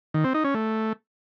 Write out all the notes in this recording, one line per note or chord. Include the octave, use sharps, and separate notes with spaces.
D#3
C4
D#4
C#4
A3